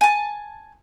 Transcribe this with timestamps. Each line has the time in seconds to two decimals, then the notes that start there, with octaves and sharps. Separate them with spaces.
0.01 G#5 A5